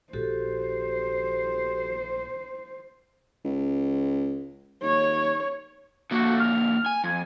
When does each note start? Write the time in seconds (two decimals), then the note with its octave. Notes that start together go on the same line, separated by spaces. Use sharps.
0.13 A#1 F#4 G4 A4 C5
3.45 C#2
4.83 D#2 C#5
6.11 D3 A3 A#3 F#4
6.39 F6
6.86 G#5
7.04 F2 G#5